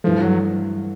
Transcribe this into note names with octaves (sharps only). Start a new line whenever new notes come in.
G2 E3 F3 A3
F#3